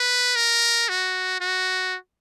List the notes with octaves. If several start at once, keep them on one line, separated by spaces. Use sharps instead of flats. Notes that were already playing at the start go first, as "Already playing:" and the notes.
Already playing: B4
A#4
F#4
F#4